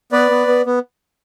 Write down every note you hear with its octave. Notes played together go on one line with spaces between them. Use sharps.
B3 B4 D5
B3
B3
B3